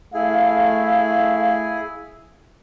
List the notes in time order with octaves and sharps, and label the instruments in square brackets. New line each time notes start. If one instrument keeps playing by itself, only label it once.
[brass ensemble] A3 F5 [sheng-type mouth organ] E4 G#4